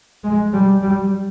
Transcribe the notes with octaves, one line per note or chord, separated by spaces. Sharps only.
G#3
G3
G3